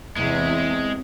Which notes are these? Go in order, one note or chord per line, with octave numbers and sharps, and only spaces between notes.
E2 C3 G#3 E4